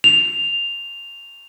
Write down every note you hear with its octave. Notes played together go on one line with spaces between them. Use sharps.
F7